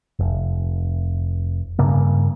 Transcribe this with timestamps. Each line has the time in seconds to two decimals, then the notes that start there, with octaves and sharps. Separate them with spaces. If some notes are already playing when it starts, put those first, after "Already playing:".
0.19 F1
1.79 G2 C#3 A#3